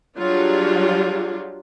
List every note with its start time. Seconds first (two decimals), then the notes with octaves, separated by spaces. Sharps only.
0.17 F#3 G3 D4 F4 G4 G#4